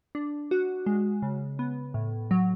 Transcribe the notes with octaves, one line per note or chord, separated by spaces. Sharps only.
D4
F#4
G#3
C#3
B3
A2
F#3